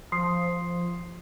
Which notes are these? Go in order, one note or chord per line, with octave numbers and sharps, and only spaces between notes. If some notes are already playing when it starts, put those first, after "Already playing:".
F3 C6 D#6 C7